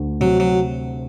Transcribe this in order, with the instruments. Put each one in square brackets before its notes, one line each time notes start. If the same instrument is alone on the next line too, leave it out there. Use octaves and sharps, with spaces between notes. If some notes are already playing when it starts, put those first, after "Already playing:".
Already playing: [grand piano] D2 D3
[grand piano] C3 [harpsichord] F#3
[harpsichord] F#3